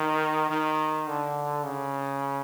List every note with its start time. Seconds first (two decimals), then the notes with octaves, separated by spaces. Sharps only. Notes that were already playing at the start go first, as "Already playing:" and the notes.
Already playing: D#3
0.50 D#3
1.07 D3
1.64 C#3